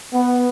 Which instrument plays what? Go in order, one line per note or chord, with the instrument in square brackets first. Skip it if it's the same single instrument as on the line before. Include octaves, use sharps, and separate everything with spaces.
[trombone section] B3